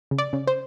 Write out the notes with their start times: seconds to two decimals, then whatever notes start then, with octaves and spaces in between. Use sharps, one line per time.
0.11 C#3
0.18 D5
0.33 C#3
0.47 C5